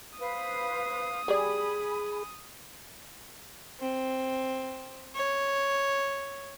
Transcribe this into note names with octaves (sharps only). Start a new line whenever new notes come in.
B4 C5 F5 D#6
G3 G#4 D5 G#5 B5
C4
C#5